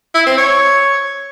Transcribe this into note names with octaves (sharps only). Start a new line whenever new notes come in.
E4
C4
C#5